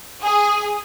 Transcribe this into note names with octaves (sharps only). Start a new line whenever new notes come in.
G#4